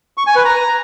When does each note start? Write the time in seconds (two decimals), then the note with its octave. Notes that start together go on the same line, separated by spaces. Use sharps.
0.17 C#6
0.27 G#5
0.36 B4
0.45 A#5